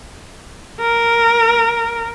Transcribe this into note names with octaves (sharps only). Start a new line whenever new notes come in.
A#4